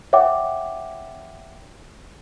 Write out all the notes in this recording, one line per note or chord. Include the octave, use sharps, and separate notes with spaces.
C#5 E5 F#5 G5 D6